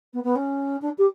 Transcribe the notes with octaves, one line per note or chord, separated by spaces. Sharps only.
B3
B3
C#4
D4
G4